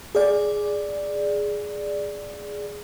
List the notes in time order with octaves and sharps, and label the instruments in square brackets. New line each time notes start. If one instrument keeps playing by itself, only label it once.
[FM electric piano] G#4 D5